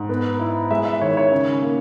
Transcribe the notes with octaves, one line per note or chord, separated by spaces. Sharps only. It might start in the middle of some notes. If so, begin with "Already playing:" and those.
Already playing: G#2
B3
E4
G#3 E5
E5
D#3 C#5
C#5
C#3
A#3